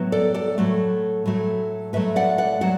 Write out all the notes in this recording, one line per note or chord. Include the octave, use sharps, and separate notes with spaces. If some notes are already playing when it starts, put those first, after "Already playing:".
Already playing: A2 F#3 B3
A4 D5
A4 D5
A2 F#3 A3
A2 F#3 A3
A2 F#3 A3 B4 E5
D5 F#5
D5 F#5
A2 F#3 D5 F#5